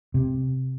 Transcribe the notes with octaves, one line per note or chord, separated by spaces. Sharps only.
C3